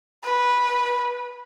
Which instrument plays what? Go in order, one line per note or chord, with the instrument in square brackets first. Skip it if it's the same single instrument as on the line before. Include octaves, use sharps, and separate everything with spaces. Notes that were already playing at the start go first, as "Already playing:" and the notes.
[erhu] B4